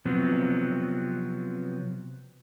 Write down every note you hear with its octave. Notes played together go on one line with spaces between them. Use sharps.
C3 F3 F#3 B3 C4